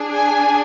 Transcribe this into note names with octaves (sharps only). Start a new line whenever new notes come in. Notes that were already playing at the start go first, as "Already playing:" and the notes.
Already playing: D4 G#4
G#5